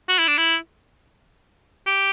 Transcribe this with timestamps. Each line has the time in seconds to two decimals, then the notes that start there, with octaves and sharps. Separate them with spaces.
0.09 F#4
0.18 E4
0.27 D4
0.38 E4
1.86 G4